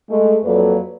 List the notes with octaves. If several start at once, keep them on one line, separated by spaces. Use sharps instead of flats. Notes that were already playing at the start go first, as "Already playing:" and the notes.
G#3 A3
F2 F#3 A#3 A4 B4 D5